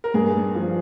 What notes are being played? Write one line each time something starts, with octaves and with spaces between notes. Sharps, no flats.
A#4
G2 G#4
F3